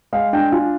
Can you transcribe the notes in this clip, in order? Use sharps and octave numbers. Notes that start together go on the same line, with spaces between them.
G#3 F5
D4 G5
F4 G#5